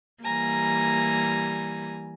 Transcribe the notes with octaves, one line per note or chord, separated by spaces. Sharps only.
E3 G3 A#3 G#5 A#5